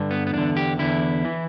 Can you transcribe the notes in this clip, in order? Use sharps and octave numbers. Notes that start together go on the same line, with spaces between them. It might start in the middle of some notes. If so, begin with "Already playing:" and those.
Already playing: G2 D3
B3
B3
E2 D3 D4
G4
E2 D3 E4
E3